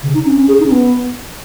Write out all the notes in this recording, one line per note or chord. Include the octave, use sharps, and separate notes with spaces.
C#3
D#4
C#4
C#4
G#4
D#4
C#4
B3